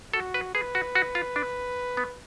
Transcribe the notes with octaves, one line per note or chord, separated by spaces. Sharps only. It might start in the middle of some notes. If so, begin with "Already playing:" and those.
F#4 A4
B4
G#4 B4
F#4
F#4
F4
D4
B3